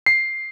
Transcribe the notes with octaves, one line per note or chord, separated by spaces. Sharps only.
C7